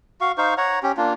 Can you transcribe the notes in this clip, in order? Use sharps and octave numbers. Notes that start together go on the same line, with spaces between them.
F#4 F5 C#6
D#4 C5 F5 C#6
C#5 F#5 A#5
C#4 G4
A#3 D4 F4